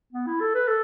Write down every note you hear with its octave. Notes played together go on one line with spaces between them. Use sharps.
B3
E4
A4
B4
A4